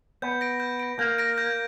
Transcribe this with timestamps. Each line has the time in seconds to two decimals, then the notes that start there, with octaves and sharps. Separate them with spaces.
0.22 B3 G6
0.41 A#6 D7
0.60 G6
0.80 A#6 D7
0.99 A#3 G6
1.18 A#6 D7
1.38 G6